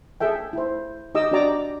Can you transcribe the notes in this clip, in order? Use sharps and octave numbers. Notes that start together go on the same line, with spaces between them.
G#4 A4 E5 G5
E4 C5
D#4 G4 D#5 D6 E6
D4 F#4 G4 D5 A#5 D6